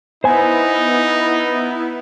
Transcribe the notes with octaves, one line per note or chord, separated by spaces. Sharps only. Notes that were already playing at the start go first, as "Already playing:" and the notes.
B3 D#4 E4 C5 G#5